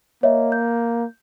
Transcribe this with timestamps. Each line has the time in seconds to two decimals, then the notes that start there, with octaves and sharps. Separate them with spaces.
0.23 A#3 C#5 D#5 E5
0.52 G6